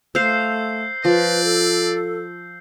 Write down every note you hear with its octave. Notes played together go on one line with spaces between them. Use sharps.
A3 C5 F5 E6 G6 C7
F3 B4 D5
A4